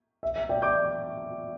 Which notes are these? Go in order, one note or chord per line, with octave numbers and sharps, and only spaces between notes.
E5
E5
D5 G5
D6 G6